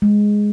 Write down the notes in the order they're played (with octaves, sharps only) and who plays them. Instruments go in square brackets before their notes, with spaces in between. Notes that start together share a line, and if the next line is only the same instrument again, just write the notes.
[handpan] G#3